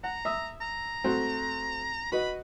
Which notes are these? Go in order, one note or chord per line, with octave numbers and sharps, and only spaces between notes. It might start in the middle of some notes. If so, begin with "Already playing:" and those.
F#5 A#5
E5 D#6 E6
A#5
A3 C4 F#4
F#4 B4 D#5 B5